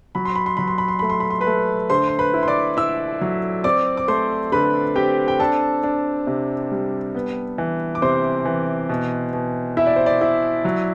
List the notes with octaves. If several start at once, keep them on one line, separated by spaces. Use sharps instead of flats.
F#3 B5
C6
B5
C6
F#3 B5
C6
B5
C6
A3 B5
C6
B5
C6
B4 B5
A3
D3 C5 C6
C6
B4 B5
E4
C6
D5 D6
E4 E5 E6
F#3
C4 D5 D6
D6
A3 C5 C6
D3 B4 B5
C4 G4 G5
G5
D4 A4 A5
D4
C3
G3
B3
E3
D6
C3 C5 C6
E3
B2
B2
E4 E5
D5
C5
D5
E4
F#3